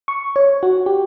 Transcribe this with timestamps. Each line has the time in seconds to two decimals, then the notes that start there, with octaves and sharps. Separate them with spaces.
0.08 C#6
0.36 C#5
0.63 F#4
0.86 G4